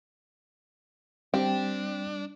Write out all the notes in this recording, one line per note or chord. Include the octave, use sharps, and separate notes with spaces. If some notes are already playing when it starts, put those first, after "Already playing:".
G3 C4 D4 G4 G5